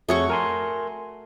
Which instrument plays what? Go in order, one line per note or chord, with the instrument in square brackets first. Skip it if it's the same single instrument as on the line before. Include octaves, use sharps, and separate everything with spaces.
[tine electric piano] F2 G#4 C#5 [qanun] A3 F#4 C#6
[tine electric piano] A#4 G#5 C6